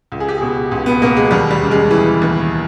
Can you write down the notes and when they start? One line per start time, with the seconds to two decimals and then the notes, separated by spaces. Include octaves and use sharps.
0.12 C#2
0.20 G#4
0.28 G4
0.38 B2 G#4
0.71 C#2
0.86 B3
1.02 B2 A#3
1.17 G#3
1.31 D#2 G3
1.51 G3
1.61 C#3
1.71 G#3
1.91 E3
2.22 D#2